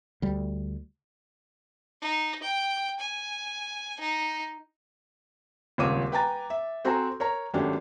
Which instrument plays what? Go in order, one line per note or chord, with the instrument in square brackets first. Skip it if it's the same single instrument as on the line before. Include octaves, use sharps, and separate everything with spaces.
[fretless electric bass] D2 G3
[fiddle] D#4
G5
G#5
D#4
[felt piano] D#1 C#2 C4 C#5 D6 D#7
B4 G5 G#5 A#5 A6
E5
C4 F#4 A4 C5 G#5 A#5
A#4 C#5 A#5
G#1 F#3 A3 C#4 D4 G4